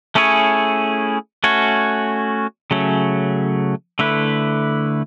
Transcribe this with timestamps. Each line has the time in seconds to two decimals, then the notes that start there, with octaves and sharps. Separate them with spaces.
0.15 A3 C#4 E4 G#4 C#5
1.44 A3 C#4 F#4 C#5
2.71 C#3 F#3 A3 C#4
3.99 D3 A3 E4 B4